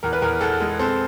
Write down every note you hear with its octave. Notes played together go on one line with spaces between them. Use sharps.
E2 A#4
B4
E2 A#4
E2 A4
G#3
C4 A4